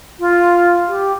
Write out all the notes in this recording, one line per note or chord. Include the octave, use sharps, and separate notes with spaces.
F4
G4